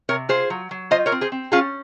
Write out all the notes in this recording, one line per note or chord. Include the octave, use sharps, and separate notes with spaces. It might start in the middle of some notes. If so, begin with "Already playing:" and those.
C3 A#4 C#5
F4 G#4 C5
F#3
F#3
F4 C5 D#5
A#4 C#5
C4
G#4 C5
C4
C#4 F4 G#4